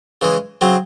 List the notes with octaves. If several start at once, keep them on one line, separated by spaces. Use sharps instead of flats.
C#3 E3 G#3
C#3 F#3 C4